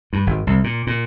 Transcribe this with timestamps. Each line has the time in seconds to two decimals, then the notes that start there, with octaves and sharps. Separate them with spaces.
0.13 G2
0.27 G#1
0.47 C2
0.64 A#2
0.87 A#2